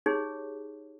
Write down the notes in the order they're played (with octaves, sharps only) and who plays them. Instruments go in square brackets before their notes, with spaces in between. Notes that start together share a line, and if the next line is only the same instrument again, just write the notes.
[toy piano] D#4 G4 G#4 C#5